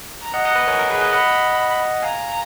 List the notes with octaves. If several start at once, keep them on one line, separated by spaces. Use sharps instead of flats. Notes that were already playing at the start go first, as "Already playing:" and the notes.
A#5
D#5 F#5
D#5 F#5
B4 D#5
A#4 C#5 G#5
A#4
G#4 B4
B4 D#5
D#5 F#5 B5
F5 G#5 A#5